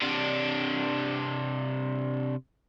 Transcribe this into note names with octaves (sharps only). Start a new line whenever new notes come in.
C3 D4